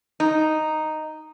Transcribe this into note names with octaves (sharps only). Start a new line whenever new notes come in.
D#4